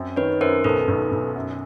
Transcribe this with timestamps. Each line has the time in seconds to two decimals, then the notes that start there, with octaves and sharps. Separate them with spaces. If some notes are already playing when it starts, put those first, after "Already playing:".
Already playing: F#2 C4
0.16 D#3 B4 C#5
0.41 F#2 A#4 C5
0.64 B1 A4 B4
0.88 B1
1.12 B1
1.36 F#2